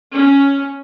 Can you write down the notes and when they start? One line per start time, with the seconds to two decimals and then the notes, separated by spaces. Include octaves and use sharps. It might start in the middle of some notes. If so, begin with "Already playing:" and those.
0.15 C#4